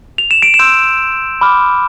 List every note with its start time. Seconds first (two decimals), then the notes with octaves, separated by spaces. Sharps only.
0.18 F7
0.31 E7
0.42 D7
0.54 E7
0.59 C6 E6 G6
1.41 B5 D6 F6